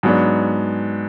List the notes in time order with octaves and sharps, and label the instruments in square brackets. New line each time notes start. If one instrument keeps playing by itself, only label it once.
[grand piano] G#2 F#3 B3 D4